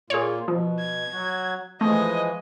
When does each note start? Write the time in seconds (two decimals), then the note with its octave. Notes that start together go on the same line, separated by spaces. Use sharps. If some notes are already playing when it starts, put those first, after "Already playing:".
0.10 A#2 A#3 F4 G#4 C#5
0.48 B2 F3
0.79 G#6
1.12 F#3 F#4
1.81 E3 F3 G#3 A3 D#5 G#5